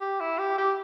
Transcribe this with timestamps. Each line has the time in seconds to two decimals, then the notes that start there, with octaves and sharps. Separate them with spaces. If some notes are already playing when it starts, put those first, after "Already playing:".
0.01 G4
0.20 E4
0.38 G4
0.58 G4